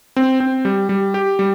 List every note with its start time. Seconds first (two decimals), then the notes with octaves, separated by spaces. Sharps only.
0.16 C4
0.40 C4
0.65 G3
0.89 G3
1.14 G4
1.39 G3